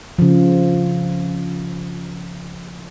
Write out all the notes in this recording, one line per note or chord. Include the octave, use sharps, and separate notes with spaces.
C#3 F3